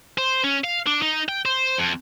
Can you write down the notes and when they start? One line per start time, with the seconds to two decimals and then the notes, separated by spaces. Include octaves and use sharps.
0.18 C5
0.44 C#4
0.64 F5
0.87 D4
1.02 D#4
1.29 G5
1.45 C5
1.78 F2